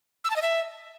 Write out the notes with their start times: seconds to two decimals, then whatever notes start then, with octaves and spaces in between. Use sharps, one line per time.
0.24 E6
0.30 A5
0.36 D#5
0.42 E5